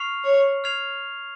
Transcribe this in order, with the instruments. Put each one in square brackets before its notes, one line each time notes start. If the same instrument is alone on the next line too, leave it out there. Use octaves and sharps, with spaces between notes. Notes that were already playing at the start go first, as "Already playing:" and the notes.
Already playing: [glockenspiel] C#6 F6 C7 F7
[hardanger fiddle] C#5
[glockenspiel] F6 G#6 C7 F7